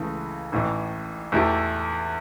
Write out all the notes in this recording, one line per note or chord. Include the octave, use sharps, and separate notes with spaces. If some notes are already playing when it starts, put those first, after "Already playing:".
Already playing: C#2 C#3 E3 A3
A1 A2 E3
E2 E3 A3 E4 G4